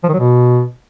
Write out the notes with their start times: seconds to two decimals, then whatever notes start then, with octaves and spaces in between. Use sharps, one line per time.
0.04 F3
0.09 D#3
0.14 F#3
0.19 B2